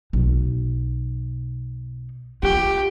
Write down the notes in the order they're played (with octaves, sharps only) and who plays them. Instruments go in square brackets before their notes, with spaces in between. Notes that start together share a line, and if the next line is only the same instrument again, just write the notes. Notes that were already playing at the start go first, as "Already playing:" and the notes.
[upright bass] B1 D#4
[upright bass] F4 [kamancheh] G4